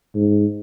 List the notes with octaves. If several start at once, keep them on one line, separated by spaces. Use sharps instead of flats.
G#2